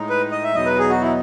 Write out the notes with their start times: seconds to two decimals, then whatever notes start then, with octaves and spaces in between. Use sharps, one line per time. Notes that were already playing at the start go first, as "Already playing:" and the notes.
Already playing: A2 G#3 D#4
0.10 B4
0.32 D#5
0.43 E5
0.54 E2 B2 F#3 B3 D#4 D#5
0.66 B4
0.78 G#4
0.90 F#4
1.01 E4